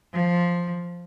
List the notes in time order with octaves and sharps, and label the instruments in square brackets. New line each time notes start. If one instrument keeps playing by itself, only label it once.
[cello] F3